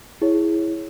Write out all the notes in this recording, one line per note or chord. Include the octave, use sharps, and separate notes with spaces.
E4 G#4 C#5